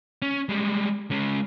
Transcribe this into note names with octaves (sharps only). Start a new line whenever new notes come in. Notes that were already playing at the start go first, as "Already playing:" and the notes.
C#4
G3 G#3
G#3 C#4